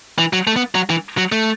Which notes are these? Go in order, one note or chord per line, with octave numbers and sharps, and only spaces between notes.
E3
F#3
A3
B3
F#3
E3
F#3
A3